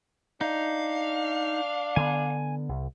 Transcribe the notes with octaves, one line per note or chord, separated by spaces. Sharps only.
D4 D#4 F5
D3 B3 G#5
C2